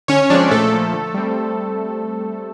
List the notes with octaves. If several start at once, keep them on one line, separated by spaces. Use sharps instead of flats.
D3 C#4 C#5
F3 G#3 C4 D4 D5
A#2 A3 A4
F3 A#3
D3
G3 C4